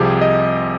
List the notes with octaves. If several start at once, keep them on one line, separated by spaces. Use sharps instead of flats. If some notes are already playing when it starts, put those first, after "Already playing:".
Already playing: C2 C3 F3 C4 G4 G#4
D#5